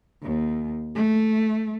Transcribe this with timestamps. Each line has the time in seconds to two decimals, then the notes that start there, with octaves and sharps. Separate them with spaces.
0.23 D#2
0.95 A3